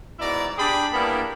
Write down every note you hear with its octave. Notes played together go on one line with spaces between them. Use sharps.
G#2 B2 E4 D5 A#5
D4 G4 G#4 D5 B5
G3 A#3 B3 D4 E4